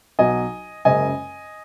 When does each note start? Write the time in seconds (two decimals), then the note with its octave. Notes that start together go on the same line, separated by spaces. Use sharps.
0.19 B1 B2 F#3 D#5 G#5
0.85 F#1 F#2 C#3 G#3 D#5 G#5